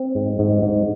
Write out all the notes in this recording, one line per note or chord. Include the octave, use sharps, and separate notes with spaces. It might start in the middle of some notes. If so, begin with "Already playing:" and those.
Already playing: C4
G#2
G#2
G#2